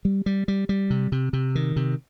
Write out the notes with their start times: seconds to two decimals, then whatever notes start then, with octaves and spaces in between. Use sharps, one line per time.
0.05 G3
0.26 G3
0.48 G3
0.69 G3
0.90 C3
1.12 C3
1.33 C3
1.55 D#3
1.76 C3